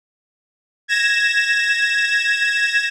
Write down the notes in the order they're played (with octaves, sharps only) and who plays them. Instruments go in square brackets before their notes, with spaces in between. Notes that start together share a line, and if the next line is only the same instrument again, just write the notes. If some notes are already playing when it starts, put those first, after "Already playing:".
[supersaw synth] G#6 A#6 E7